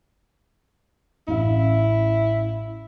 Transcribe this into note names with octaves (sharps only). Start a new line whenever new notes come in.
A1 C#4 E4 F5